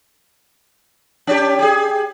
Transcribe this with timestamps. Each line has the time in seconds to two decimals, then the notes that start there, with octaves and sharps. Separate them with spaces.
1.27 C#4 D4 G4
1.59 G4 G#4